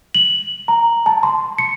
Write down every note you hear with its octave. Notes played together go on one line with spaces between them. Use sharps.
F#7
A#5
A5
C6
C#7